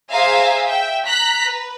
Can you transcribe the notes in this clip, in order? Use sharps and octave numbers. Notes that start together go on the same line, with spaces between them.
G#4 C5 E5 F5 G#5 A#5
E5 G5
A#5 F#6 B6
B4